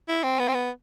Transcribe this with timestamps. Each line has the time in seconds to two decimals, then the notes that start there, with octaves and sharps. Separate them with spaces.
0.08 E4
0.23 C4
0.39 B3
0.48 C4
0.54 B3